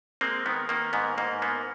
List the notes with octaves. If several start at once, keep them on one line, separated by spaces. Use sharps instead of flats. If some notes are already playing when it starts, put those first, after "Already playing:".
G#3 A#3 C4
D#3 B3
D#3 A#3
G#2 B3
G#2 A#3
A#3 B3